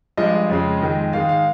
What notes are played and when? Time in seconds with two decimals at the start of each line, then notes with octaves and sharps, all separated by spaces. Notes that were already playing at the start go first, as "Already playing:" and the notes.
0.17 G2 F3 G#3 D#5
0.50 F2 C#3 G#3
0.81 F2 D#3 G#3
1.13 G#2 D#3 G#3 F5
1.29 F5